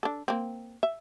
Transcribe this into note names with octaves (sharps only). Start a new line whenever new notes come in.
D4 A4
A#3 C4
E5